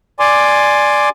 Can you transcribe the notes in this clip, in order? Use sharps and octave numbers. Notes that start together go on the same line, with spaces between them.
D5 G#5 C6 D6